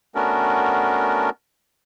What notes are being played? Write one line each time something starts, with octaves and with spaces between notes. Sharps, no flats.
A3 B3 C#4 D4 F#4 A#4